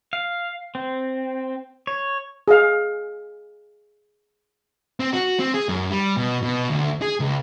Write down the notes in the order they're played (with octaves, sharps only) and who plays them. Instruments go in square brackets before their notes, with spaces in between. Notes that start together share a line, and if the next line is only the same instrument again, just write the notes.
[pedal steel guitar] F5
C4
C#5
[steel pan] G#4 F5
[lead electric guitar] C4
F#4
C4
G#4
F#2
G3
B2
B2
D2
G#4
C#2